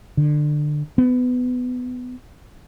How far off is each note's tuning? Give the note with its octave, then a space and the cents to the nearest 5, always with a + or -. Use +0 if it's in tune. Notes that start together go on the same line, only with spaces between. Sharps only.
D3 +25
B3 +15